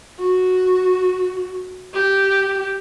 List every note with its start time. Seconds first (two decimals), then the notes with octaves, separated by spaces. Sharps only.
0.20 F#4
1.94 G4